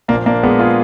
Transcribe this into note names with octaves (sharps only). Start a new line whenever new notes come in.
A#2 F3 A#3 D4
A#3 D4
G#3 B3
F4 G#4